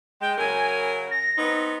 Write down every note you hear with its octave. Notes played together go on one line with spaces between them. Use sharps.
G#3 G5
C#3 F#3 A#4 G#5
A#6
B3 C4 D#4